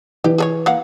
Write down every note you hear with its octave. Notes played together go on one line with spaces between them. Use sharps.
E3 D4 G4
G#4 A4 C#5
A#3 F5 F#5